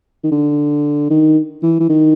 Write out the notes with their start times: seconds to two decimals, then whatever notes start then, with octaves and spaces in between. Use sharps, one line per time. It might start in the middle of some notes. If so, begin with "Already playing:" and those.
0.24 D#3
0.31 D3
1.10 D#3
1.63 E3
1.80 E3
1.89 D#3